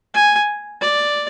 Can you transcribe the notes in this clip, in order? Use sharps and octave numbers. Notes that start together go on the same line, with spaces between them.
G#5
D5